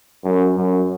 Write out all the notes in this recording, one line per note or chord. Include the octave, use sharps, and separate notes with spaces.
F#2
F#2